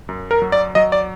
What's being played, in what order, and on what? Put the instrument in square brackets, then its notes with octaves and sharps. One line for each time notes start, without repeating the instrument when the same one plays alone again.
[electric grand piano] F#2
A#4
F#3
D5
F#3 D#5
D5